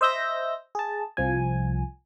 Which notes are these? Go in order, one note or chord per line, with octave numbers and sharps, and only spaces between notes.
C5 D#5 E5 E6 G6 A#6
G#4 A5
C2 F3 G#5